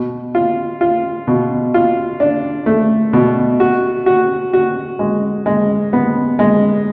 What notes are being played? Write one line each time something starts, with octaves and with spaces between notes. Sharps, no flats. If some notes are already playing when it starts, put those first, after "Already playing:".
Already playing: B2
F4
F4
B2
F4
D4
A3
B2
F#4
F#4
F#4
G#3
G#3
B3
G#3